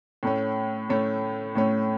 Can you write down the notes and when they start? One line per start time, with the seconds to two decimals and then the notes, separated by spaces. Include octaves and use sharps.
0.23 A2 A3 C#4
0.90 A2 A3 C#4
1.55 A2 A3 C#4